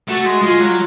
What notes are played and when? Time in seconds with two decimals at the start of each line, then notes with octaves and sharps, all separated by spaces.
0.08 A3 F#4
0.26 G#3
0.43 G#3 F4
0.60 F#3